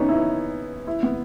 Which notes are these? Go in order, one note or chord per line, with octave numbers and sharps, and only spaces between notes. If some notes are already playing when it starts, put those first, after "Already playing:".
Already playing: B3 C#4 D#4
E4
E4
B3